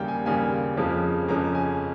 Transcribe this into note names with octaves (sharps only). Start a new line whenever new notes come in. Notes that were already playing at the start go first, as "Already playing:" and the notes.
Already playing: D#2 C#3 G3 A#3 F5 G5
G#5
D#2 C#3 G3 A#3 G#5
F2 C#3 F3 G#3 C#4
F2 C#3 F3 G#3 C#4 A#5
G#5